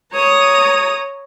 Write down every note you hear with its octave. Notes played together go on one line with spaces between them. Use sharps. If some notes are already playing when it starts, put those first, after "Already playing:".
C#5 A#5 D#6